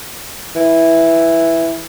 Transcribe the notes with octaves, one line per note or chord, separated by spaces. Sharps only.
E3